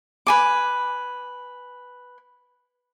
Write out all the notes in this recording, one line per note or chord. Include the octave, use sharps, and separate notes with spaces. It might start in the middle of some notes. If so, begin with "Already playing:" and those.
B4 G#5 D6